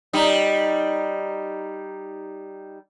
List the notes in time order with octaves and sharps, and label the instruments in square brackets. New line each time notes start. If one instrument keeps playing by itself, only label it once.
[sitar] G3 D#4